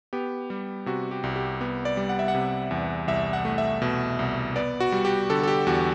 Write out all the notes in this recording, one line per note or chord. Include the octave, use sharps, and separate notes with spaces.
B3 G4
G3
C3 F#4
G4
C2
G4
B3
D5
G3
F#5
E5
F#5
C3
E2
C2 E5
F#5
A3
E5
B2
C2
B3 D5
F#4
G3
G4
D3 A4
A4
G4
E2 F#4